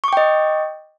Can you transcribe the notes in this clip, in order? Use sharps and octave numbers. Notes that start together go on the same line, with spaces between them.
D#5 G5 C#6 D6